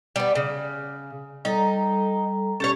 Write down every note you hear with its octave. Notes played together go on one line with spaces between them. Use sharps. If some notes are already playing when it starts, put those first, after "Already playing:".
G3 B3
C#3
G3 D#4 A4 A#5
C#4 G4 A4 C#5